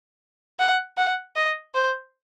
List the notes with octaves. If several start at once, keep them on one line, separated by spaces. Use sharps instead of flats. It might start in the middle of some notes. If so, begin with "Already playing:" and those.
F#5
F#5
D#5
C5